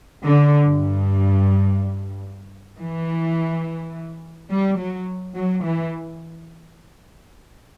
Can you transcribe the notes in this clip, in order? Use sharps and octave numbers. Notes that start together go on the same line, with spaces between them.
D3
G2
E3
G3
F#3
F#3
E3